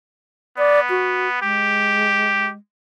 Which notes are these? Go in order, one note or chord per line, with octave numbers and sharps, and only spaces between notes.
B3 D5
F#4
G#3 G4